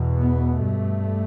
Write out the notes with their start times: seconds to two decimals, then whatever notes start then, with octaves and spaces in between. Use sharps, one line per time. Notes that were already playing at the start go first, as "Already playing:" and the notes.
Already playing: E2 B2
0.18 B3
0.61 G2 A3